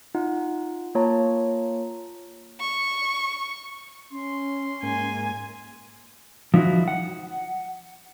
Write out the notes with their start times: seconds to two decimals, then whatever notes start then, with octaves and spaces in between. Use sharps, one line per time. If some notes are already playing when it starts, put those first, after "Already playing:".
0.15 D#4 F4 F#5
0.95 A#3 F4 C#5 A5 A#5
2.61 C#6
4.11 C#4 C6
4.83 G#2 A#3 G#5
6.54 F3 D#4 E4 F#4
6.88 F#5